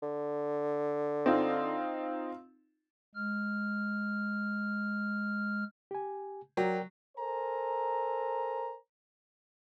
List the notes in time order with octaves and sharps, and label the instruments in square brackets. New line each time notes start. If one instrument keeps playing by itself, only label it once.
[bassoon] D3
[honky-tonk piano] C4 D#4 F4
[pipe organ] G#3 F6
[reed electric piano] G4 G#5
[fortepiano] F#3 [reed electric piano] A#4 D5 G5
[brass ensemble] A4 A#4 C5 G#5 A#5